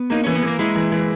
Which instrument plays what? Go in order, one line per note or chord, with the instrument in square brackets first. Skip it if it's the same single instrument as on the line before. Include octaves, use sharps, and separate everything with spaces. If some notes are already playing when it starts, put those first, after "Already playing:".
Already playing: [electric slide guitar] B3
[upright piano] A#3 [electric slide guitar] D#4
[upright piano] E3 [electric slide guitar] C#4
[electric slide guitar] B3
[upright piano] E3
[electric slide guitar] A#3
[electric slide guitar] G#3 [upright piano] E4
[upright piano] E3
E3